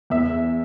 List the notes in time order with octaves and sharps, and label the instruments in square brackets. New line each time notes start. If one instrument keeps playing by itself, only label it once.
[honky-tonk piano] E2 E5